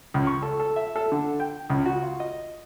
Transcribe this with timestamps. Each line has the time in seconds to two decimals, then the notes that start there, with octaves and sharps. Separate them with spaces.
0.14 C#2
0.27 C#6
0.42 A4
0.60 A4
0.76 E5
0.96 A4
1.12 D3
1.40 G5
1.70 C#2
1.86 F#4
2.03 F4
2.20 D#5